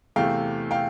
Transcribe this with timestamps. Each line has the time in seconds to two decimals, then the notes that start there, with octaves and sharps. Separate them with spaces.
0.16 E2 C3 E3 A3 F5 G5
0.71 F5 G5